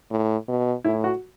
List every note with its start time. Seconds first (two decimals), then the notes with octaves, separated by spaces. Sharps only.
0.11 A2
0.48 B2
0.84 A2 E4
1.04 F#4